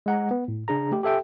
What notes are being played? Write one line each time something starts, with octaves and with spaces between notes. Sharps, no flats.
G#3 F#5 A#5
B3
A2
C#3 D4 G#4 A#5
A3 G4
G4 A4 E5 G5